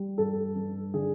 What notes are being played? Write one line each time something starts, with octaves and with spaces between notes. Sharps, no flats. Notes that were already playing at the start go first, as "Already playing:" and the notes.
Already playing: G3
G2 A4
G2
D3 G#4